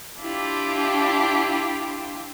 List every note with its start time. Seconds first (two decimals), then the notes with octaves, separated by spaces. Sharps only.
0.20 D4 E4 F4 G4